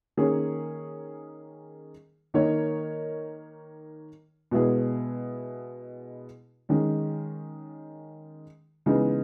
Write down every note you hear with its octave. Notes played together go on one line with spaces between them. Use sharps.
D#3 A#3 C#4 G#4 C#5
D#3 A#3 D#4 A#4 C#5
B2 G#3 B3 E4 G#4
D#3 G#3 C#4
C#3 E3 G#3 B3 D#4